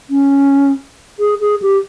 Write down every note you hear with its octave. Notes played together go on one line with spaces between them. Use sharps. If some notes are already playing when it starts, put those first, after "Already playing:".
C#4
G#4
G#4
G4